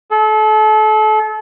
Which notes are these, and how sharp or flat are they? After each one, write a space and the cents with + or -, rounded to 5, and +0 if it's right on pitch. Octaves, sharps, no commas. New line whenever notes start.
A4 -35